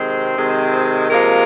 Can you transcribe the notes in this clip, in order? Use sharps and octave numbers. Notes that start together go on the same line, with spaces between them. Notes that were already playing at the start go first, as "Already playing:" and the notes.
Already playing: C3 D#3 G#3 C4 C5
C3 D#3 G#3
C3 F3 G#3 A#3 A#4